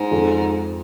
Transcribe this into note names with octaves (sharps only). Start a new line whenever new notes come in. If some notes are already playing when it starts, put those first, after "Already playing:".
Already playing: G#2
F2